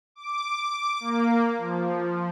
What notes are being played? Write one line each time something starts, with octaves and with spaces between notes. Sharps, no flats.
D6
A#3
F3